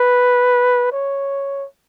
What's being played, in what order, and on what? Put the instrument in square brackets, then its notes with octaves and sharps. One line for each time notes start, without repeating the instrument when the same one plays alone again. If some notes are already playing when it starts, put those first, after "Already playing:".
Already playing: [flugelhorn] B4
C#5